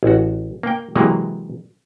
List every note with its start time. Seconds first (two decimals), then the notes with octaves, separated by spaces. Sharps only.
0.03 A1 F#4
0.63 A#3 G5
0.96 C3 E3 F#3 G#3 A#3